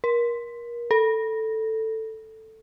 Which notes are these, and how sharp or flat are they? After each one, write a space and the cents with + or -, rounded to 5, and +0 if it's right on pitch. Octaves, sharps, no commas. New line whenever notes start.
A#4 +30
A4 +5